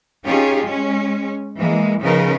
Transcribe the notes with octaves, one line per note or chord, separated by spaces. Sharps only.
C#4 D#4 F4 G4 G#4
G#3 C#4
E3 G#3 A#3
C#3 F3 B3 D#4 A#4 B4